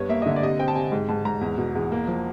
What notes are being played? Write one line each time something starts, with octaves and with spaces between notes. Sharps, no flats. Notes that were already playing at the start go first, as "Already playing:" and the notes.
Already playing: G2 B3 C#5
A#3 E5
D#5
D3 E5
D5
C3 D#5
C4 G5
A5
C3 G#5
G#2
G#2 A5
G#2 A#5
E2
B2
E2
A#3
F3